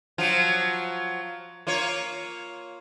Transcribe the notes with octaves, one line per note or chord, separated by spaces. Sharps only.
F3 F#3 F4
A#3 F4 C#5